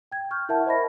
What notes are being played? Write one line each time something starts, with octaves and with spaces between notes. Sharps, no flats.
G5 G#6
C#6 F6 G6
E4 A#4 E5 F#5 A5
C5 D#5 B5 A#6